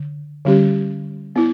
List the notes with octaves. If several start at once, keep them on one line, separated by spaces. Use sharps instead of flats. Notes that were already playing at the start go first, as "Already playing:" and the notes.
Already playing: D3
D3 G3 C#4 G4
B3 E4